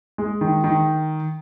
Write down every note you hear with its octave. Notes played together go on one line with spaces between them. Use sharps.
G#3
D#3
D#3